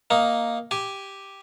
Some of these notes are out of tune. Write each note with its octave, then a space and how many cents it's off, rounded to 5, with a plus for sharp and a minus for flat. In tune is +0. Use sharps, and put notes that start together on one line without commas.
A#3 +0 D#4 +0
G4 +0 G#5 +0